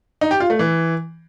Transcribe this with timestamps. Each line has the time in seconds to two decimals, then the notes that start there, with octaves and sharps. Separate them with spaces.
0.21 D#4
0.31 G4
0.40 F4
0.50 A3
0.59 E3